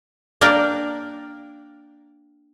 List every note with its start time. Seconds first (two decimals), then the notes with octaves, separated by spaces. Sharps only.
0.41 A#3 D4 A#4 D5 G5